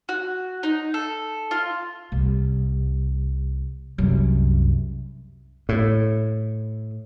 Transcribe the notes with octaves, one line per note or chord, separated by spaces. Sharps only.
F#4
D#4
A4
F4
C2
C2 F#2
A2